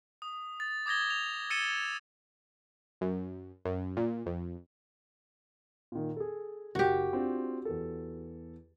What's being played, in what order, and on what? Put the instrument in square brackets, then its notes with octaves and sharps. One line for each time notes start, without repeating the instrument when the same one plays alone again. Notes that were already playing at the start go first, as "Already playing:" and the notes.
[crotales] D#6
A6
D6 D#6 G#6 A#6 G7
F7
E6 A6 C#7 D#7 E7 G7
[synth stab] F#2
F#2
A#2
F2
[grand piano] A#2 D#3
G#4 A4
[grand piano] F#1 [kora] F#4 G4
[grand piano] C4 D4 F4
E2 A4